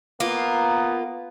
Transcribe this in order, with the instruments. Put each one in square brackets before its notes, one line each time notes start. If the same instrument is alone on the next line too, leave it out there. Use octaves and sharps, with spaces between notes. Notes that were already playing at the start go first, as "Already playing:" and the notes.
[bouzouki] A#3 F4 [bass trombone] B3